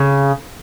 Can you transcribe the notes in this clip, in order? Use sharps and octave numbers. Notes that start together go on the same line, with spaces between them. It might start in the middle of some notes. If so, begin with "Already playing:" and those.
Already playing: C#3